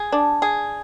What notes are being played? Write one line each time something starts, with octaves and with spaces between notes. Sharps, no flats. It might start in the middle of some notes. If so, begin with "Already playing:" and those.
Already playing: G#4
D4
G#4